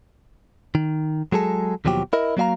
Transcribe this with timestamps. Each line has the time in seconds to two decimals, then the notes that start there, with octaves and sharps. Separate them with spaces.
0.75 D#3
1.32 F#3 G#3 G#4 A4
1.85 D#2 B2 F3 F#3 G4
2.13 E4 A#4 D#5
2.37 F#3 A#3 F#4 E5 F5 A#5